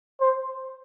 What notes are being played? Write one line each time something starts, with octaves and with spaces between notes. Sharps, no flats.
C5